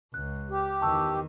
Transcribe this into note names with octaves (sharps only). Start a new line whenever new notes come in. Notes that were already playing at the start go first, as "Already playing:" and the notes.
C#2 F#6
G4
E2 D#3 A5 C#6 E6